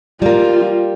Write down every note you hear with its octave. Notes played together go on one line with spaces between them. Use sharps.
G3 A#3 F4